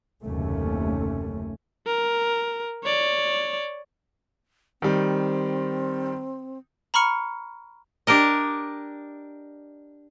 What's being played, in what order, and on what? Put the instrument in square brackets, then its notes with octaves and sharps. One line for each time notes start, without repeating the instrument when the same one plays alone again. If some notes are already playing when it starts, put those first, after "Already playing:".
[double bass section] F#1 D#2 C3 A3 C#4
[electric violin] A#4
C#5 D5
[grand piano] D#3 G3 [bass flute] C4
[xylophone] A#5 B5 C#6 F6 C#7
[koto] D4 G4 A#4 D#5